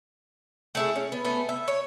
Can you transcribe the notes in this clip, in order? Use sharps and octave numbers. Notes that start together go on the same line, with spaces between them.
A3 E4 G#4
C#4
B3
A3 B3 G#5
E5
C#5